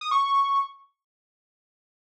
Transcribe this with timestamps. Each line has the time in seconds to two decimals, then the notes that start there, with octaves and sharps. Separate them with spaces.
0.01 D#6
0.11 C#6